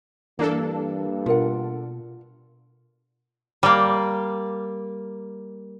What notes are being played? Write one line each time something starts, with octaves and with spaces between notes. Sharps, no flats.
G2 E3 A#3 D4 A4
B2 F4 A#4 F#5
G3 A#3